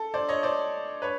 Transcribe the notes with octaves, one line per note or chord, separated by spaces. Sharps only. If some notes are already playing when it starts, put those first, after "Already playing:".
Already playing: A4
C5 D5
C#5 D#5
C5 D5
B4 C#5